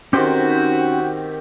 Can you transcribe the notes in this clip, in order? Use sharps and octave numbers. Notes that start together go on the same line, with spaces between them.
D#3 C4 C#4 F#4 G4 C5